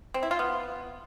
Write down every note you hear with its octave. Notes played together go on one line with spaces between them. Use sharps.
C4
E4
F4
B3